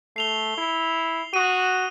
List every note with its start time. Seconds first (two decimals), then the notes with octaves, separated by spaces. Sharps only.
0.16 A3 C7 F7 G7
0.57 E4
1.34 F#4 D#6 D#7